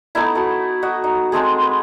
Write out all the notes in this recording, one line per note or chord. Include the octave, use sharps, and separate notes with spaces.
A3 B3 D#4 E4
A3 F#4
F#4 D#5
D#4
G#3 A3 C4 G#4
B4